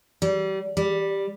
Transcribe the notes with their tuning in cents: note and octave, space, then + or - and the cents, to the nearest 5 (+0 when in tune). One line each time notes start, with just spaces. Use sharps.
G3 -30
G3 +5